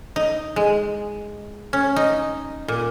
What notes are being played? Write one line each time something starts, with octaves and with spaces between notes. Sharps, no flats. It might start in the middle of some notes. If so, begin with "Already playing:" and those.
D#4
G#3
C#4
D#4
A#2